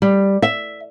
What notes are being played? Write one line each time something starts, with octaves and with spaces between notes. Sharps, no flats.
G3
E5